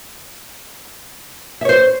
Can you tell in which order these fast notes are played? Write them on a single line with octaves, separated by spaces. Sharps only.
E5 C#5 C5